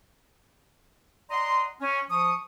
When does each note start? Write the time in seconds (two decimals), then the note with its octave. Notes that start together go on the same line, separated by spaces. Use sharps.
1.30 D5 D#5 F#5 A#5 C6
1.81 C#4
2.10 F3 C#6 D#6